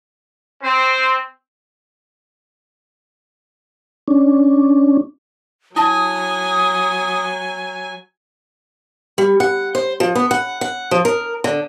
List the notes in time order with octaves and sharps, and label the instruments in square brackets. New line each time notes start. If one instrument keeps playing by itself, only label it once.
[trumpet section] C4 [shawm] C5
[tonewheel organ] C#4 D4
[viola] F#3 G#5 [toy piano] E4 A5 [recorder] D#6
[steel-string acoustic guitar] G3
F#5
C5
F3
B3
F#5
F#5
F3
A#4
D3